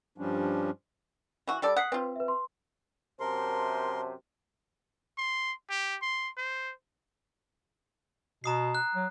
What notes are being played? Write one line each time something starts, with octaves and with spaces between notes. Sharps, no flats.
G2 F3 G3 C#4 D4
E3 F#4
G3 A4 D5
F#5 D#6 B6 C7
C4 F4 B4
B4 E5
C6
F#2 C3 A#4 C5 A5 C6
C6
G4
C6
C5
B2 A#5 D#6 C7
F#6
F#3